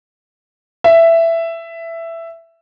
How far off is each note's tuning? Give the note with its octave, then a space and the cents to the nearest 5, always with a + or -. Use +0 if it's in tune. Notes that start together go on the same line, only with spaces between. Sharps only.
E5 +10